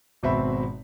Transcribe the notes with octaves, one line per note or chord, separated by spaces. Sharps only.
G#1 B2 C4 E5 B5